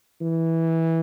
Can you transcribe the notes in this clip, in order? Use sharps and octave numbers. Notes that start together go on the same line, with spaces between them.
E3